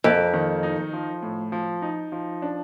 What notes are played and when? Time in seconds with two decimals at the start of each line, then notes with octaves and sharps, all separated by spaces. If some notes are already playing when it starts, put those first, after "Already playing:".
0.04 F2 A#3
0.33 D#3
0.63 D#4
0.93 F3
1.22 A2
1.52 F3
1.82 D#4
2.12 F3
2.42 D4